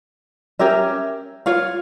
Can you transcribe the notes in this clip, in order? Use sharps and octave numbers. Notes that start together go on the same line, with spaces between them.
C#4 G4 A#4 E5
F4 C#5 F5